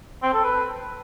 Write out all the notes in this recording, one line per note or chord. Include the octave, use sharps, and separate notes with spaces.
C4
A4
B4